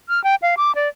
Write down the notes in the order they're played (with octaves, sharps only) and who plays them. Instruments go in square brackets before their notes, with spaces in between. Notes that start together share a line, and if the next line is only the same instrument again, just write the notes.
[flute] F6
G5
F5
D6
D5